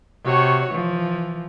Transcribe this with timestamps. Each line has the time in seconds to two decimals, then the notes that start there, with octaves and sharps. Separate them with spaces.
0.25 C3 F#4 C#5
0.71 E3 F3